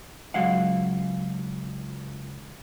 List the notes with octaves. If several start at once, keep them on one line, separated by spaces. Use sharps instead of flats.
C#2 F#3 G#3 F5 F#5